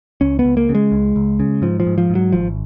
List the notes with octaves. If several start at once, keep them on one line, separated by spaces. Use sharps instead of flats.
C#2 C#4
B3
C#2
A#3
C#3
G#3
C#2
C#2
C#3
G#2 F3
F3
G#2
F3
G#2
F#3
G#1 F3